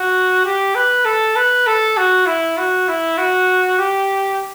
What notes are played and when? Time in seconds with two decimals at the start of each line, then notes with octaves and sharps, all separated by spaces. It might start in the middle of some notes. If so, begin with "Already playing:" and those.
Already playing: F#4
0.45 G4
0.75 B4
1.05 A4
1.36 B4
1.67 A4
1.97 F#4
2.27 E4
2.57 F#4
2.88 E4
3.18 F#4
3.79 G4